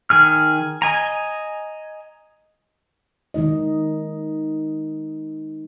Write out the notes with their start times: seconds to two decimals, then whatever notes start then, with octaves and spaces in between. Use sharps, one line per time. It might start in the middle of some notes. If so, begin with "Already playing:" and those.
0.10 D#3 G#4 F6
0.82 D#5 G#5 A#5
3.34 D#3 G#3 D#4 D#5